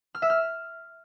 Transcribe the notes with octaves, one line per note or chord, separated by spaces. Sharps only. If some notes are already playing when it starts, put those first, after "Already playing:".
F6
E5
F6